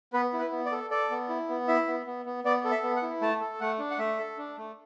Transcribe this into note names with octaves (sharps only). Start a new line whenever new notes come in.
B3 B4
E4
B4
B3
D5
A4
A4 D5
B3
E4
B3
E4 E5
B3
B3
B3
B3 D5
A4
E5
B3
F#5
E4
A3 A5
A4
A3 F#5
D4
F#5
A3 E5
A4
D4
A3